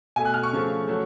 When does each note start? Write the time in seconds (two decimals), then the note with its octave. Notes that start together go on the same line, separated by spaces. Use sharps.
0.16 B2 A3 G#5
0.25 F#6
0.34 F6
0.43 C#6
0.53 C#3 F3 A3
0.87 F#3 A3